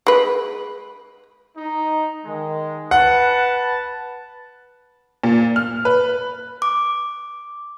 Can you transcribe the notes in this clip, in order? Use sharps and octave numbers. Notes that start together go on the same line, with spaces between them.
G#3 B4
D#4
D#3 G#3
B4 F#5 A5
A#2
F6
B4
D6